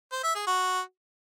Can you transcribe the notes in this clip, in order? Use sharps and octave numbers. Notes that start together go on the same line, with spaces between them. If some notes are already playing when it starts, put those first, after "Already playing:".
C5
E5
G#4
F#4